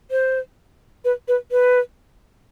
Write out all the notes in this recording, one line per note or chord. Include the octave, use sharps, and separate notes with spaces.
C5
B4
B4
B4